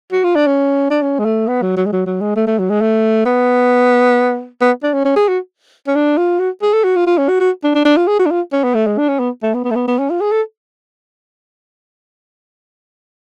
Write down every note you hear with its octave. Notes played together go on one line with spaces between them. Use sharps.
F#4
F4
D4
C#4
D4
C#4
G#3
A3
B3
F#3
F#3
G#3
F#3
F#3
G#3
A3
A3
F#3
G#3
A3
B3
B3
D4
C#4
C#4
G#4
F#4
C#4
D4
F4
F#4
G#4
A4
F#4
F4
F4
C#4
F#4
F#4
D4
D4
D4
F4
G#4
F#4
D4
F4
C#4
B3
A3
G#3
D4
C#4
B3
A3
B3
B3
A3
B3
B3
C#4
F4
G#4
A4